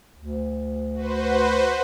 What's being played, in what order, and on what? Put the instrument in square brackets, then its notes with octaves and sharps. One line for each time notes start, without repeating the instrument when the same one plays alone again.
[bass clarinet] D2
[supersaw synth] F#4 B4 C5